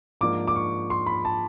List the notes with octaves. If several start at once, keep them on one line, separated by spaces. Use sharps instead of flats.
G#2 F3 A#3 D4 D6
D6
C#6
C6
B5
A5